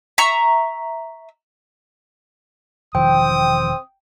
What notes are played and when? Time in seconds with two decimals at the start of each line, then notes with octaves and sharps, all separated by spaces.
0.18 E5 A#5 C#6
2.95 E1 D#3 F3 C4 G5 D#6